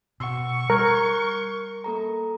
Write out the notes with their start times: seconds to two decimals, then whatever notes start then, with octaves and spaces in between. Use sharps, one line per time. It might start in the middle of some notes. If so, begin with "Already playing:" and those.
0.20 B2 F#5 C#6 E6
0.70 G3 A#4 F6 F#6 G#6
1.84 A#3 A4 A#5